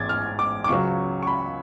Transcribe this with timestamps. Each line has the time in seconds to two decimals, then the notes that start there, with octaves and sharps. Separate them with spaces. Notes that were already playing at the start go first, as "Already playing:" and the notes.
Already playing: A1 G#2 G#3 C#4 D6 G#6 A6
0.09 F6
0.39 D6
0.64 D6
0.68 C#2 C#3 F#3 C#6
1.23 C#6
1.27 B5